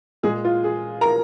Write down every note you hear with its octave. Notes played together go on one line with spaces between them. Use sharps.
A#2 G#3 G#4
F4
G#4
A#4 A#5